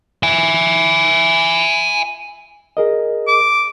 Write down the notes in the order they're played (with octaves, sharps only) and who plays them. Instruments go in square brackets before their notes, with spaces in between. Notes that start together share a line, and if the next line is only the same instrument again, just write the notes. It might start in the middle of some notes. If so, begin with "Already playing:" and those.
[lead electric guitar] E5 G#5
[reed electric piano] G#4 A#4 D#5
[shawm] D6